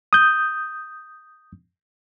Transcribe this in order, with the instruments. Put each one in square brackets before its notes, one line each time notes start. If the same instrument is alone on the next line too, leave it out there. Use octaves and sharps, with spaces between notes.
[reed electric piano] D#6 G6